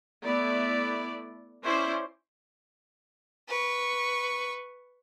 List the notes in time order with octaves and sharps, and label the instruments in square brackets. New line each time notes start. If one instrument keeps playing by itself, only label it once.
[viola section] A3 B3 E4 D5
C#4 E4 C5 D5
[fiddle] B4 C#6